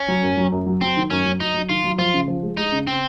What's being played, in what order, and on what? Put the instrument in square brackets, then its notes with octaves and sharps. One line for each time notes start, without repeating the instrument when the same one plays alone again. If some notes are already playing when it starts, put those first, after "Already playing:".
Already playing: [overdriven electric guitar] C#4
[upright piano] F#3
F#2
F#3
F#2
F#3
[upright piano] F#3 [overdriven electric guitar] C4
[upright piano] D#3
[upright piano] F#2 [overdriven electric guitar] C#4
[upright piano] F#3
[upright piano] F#3 [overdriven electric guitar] D#4
[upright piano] F#3
[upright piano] D#3 [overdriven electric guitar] F4
[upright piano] F#3
[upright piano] F3 [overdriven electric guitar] F4
[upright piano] C#3
F3
G#3
[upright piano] G#3 [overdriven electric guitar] D#4
[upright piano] C#3
[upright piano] C#3 [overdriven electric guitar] C4